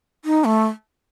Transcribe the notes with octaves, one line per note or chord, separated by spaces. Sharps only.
D#4
A3